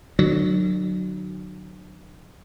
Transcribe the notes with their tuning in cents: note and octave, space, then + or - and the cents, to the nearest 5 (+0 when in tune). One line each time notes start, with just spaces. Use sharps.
D3 +40 F#3 +0